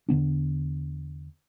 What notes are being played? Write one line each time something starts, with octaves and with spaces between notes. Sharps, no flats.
E2 D3 B3 D4